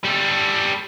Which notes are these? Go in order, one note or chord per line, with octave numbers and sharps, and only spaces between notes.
G3 A4